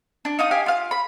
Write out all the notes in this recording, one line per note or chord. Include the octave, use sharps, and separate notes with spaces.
D4
D#4 F5 D#6
G4 F5 G#5
F4 F5
B5